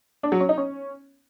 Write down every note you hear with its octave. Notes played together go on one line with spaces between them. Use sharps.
D4
F#3
C#4
D#4
C#4